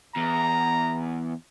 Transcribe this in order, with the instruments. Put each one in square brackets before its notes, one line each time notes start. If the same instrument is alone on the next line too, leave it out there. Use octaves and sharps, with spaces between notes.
[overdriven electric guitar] E2 [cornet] A#5